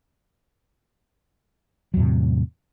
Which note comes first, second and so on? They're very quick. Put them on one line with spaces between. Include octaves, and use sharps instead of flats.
F#3 E2 A2 C3